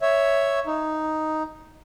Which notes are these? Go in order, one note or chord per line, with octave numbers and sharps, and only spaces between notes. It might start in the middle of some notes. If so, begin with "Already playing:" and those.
C#5 E5
D#4